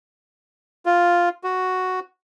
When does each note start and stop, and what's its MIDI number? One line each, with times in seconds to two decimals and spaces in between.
0.86 1.29 65
1.44 2.00 66